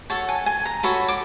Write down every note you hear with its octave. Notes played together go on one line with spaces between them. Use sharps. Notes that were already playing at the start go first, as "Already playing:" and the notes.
F#4 A4 C#5 A5
G#5
G#5
A#5
F#4 A4 C#5 B5
D6